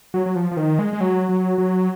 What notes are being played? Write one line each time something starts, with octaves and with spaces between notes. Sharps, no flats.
F#3
F#3
F3
F3
D#3
G#3
G#3
F#3
F#3
F#3